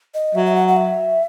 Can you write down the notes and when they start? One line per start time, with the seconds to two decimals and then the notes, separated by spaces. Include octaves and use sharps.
0.14 D#5
0.35 F#3 E5
0.46 E5
0.55 F#5
0.68 F#5
0.77 E5